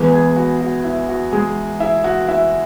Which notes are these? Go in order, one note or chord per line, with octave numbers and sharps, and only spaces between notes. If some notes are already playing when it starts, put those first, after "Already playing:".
Already playing: E2 E3 G#3 B3 B4 B5
G#4 G#5
F#4
F#4
E4
F#4
G#3 G#4
E4 E5
F#4 F#5
E4 E5